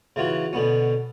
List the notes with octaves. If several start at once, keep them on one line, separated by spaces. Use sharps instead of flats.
C#3 E3 F4 F#4
B2 D3 B3 C#4